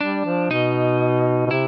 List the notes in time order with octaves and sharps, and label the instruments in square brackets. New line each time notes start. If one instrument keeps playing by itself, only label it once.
[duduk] G3 [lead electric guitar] D4
[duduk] F3
[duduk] B2 [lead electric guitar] D#4
[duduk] B2
[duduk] C3 [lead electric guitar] E4